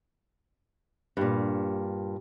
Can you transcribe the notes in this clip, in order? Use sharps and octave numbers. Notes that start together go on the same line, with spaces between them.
G2 A#2